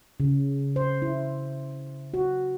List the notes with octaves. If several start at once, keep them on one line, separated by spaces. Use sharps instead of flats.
C#3
C5
E4
F#4